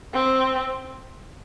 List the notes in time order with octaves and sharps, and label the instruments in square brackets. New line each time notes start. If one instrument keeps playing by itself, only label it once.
[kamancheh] C4